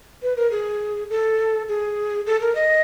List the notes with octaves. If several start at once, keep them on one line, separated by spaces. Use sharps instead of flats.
B4
A#4
G#4
A4
G#4
A4
A#4
D#5